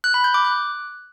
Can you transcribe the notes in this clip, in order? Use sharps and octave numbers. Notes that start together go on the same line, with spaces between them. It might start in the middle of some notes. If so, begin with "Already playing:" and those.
F#6
B5
G6
D6
F#6